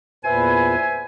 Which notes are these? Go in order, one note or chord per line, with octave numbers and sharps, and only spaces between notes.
E2 A#2 B4 C5 E5 G#5